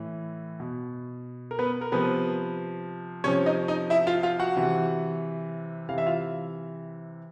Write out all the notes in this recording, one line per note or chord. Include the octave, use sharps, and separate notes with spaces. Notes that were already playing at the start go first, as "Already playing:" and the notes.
Already playing: A2 E3
B2
A#4
B3 B4
A#4
C3 F3 B3 B4
C3 F3 C#4 C#5
D#4 D#5
D#4 D#5
E4 E5
F4 F5
F4 F5
F#4 F#5
C3 E3
C3 E3 F5
E5
F4 F5